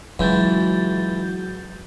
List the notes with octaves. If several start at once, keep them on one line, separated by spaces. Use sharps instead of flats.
C#2 E3 F#3 F#4 G6 A6